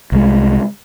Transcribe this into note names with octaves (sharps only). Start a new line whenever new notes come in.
C2 G#3